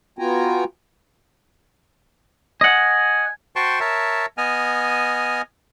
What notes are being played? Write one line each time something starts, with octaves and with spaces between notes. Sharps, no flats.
B3 F4 F#4 G5 G#5 A#5
D#5 F#5 G#5
F#4 C5 G5 A5 C6 C#6
A#4 C#5 E5 A5
B3 D#5 G#5 F6